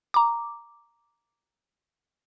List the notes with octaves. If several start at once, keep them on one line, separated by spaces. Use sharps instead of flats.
A#5 D6